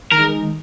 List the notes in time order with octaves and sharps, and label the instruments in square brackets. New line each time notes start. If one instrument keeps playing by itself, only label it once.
[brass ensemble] D#3 G#3 D#4 [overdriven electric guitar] A#4